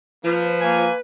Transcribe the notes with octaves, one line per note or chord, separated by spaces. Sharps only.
F3 A#3 B4
A#3 G#5